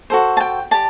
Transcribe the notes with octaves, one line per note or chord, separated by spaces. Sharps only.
F#4 A4 C5
A5
G5
G4 D5 A5